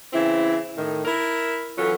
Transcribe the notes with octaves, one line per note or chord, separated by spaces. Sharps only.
C#3 E3 C4 E4
A2 D#3
E4 A#4
E3 F#3 C#4 F4 A4